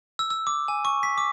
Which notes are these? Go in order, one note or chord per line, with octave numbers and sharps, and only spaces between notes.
E6
E6
D6
G#5
C#6
B6
D6